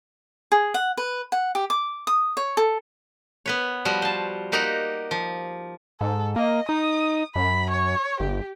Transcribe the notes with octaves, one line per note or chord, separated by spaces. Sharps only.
G#4
F#5
B4
F#5
G4
D6
D#6
C#5
A4
B3 B4 C#5
F3 G3 F#4
C5 A5
A#3 D#4 G4 F#5 A#5
F3
G#2 A4
A#3 D#5
D#4 D#6
F#2 B5
C#5
G1 G4